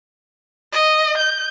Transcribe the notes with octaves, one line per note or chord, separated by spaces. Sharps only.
D#5
G6